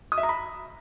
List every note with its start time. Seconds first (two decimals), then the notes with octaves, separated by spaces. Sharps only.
0.12 D#6
0.18 E5
0.23 A#5
0.29 B5